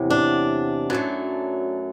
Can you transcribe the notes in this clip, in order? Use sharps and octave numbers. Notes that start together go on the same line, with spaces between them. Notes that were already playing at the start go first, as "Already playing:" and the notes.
Already playing: E2 C3 F#3
D4
F#2 F#3 A3